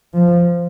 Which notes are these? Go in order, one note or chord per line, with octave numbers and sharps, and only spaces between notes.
F3